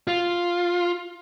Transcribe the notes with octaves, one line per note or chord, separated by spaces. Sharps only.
F4